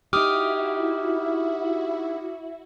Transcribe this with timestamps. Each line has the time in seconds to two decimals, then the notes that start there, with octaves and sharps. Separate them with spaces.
0.13 D#4 E4 F#4 G4 E5 D6 D#6 F6